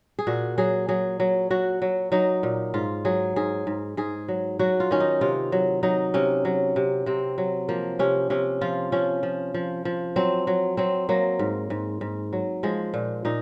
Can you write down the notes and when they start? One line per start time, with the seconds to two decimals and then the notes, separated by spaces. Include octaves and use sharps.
0.19 G#4
0.27 A#2 F#4
0.58 F#3 G#4
0.89 F#3 G#4
1.20 F#3
1.50 F#3 F#4
1.82 F#3
2.12 F#3 D#4
2.43 A#2
2.74 G#2 F4
3.05 F#3 G#4
3.36 G#2 G#4
3.67 G#2
3.97 G#2 G#4
4.28 F#3
4.59 F#3 F#4
4.80 F4
4.91 D#3 C#4
5.00 D#4
5.21 C3 F4
5.52 F#3
5.83 F#3 D#4
6.14 C3 C#4
6.45 F#3
6.76 C3
7.06 C3 C4
7.38 F#3
7.69 F3 A#3
7.99 C3 C#4
8.30 C3 C#4
8.61 F3 F4
8.92 F3 C#4
9.23 F3
9.54 F3
9.85 F3
10.16 F#3 C4
10.47 F#3
10.77 F#3 C4
11.09 F#3 A#3
11.39 G#2
11.70 G#2
12.01 G#2
12.33 F#3
12.63 F3 G#3
12.94 A#2
13.25 A#2 D#4